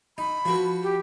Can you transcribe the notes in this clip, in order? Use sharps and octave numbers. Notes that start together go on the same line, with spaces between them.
D#4 B5
F3 F#4 B4
G4